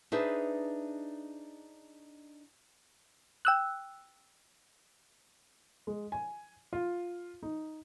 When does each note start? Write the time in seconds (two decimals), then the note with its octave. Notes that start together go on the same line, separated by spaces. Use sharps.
0.12 D4 D#4 G#4 B4 C5 E5
3.45 G5 E6 F#6
5.87 G#3
6.12 G#5
6.73 F4
7.43 D#4